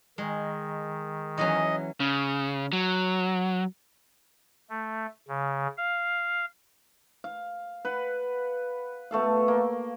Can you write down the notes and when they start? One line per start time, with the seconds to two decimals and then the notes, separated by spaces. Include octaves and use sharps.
0.18 D#3 G#3
1.38 E3 F#3 C#4 D#5
2.00 C#3
2.73 F#3
4.70 A3
5.28 C#3
5.78 F5
7.24 F5
7.85 B4 F#5
9.11 B2 A3 A4 F5
9.48 A#3